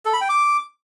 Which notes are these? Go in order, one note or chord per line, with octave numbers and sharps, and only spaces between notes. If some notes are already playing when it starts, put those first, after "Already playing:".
A4
B5
G5
D6